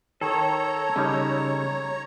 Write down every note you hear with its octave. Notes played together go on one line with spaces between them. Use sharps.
D#3 A4 C#5 A#5
C#3 G3 D#4